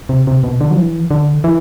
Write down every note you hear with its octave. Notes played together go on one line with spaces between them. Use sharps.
C3
C3
B2
D3
F#3
E3
D3
E3